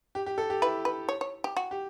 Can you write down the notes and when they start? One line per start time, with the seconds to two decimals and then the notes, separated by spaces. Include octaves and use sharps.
0.15 G4
0.26 G4
0.38 A4
0.50 G4
0.62 E4 B4
0.85 B4
1.09 C#5
1.21 C#5
1.44 G4
1.57 F#4
1.71 G4